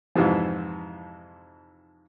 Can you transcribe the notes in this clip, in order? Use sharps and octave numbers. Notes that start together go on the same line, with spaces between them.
F2 G#2 C3 E3 F3